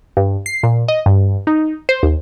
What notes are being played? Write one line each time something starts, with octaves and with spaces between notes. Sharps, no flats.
G2
C7
A#2
D#5
G2
D#4
C5
D#2